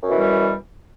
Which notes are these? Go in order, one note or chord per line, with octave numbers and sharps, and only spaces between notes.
F#2 B2 E3 G3